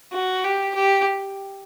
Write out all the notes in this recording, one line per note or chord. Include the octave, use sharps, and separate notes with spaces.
F#4
G4
G4